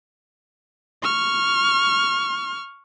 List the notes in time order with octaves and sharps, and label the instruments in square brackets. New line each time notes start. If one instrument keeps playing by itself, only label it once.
[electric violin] C#6 F6